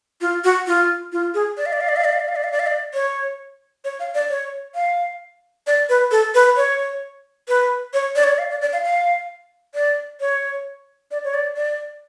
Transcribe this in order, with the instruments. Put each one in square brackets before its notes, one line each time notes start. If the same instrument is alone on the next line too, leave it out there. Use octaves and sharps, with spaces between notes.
[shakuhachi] F4
F#4
F4
F4
G#4
D5
F5
D5
F5
D5
F5
D5
F5
D5
F5
D5
F5
D5
F5
D5
C#5
C#5
F5
D5
C#5
F5
D5
B4
A4
B4
C#5
B4
C#5
D5
C#5
D5
F5
D5
D5
F5
F5
D5
C#5
D5
C#5
D5
D5